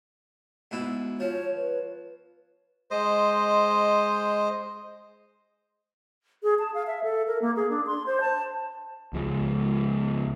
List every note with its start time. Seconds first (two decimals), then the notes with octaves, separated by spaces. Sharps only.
0.71 G#2 B2 E4
1.20 F3 C#5
1.55 B4
2.91 G#3 C5 D#5
6.43 G#4
6.59 A5
6.74 F5
6.87 E5
7.04 A4
7.27 A#4
7.42 A#3
7.56 G#4
7.70 D4
7.87 C6
8.06 C5
8.21 A5
9.13 C#2 F3 G#3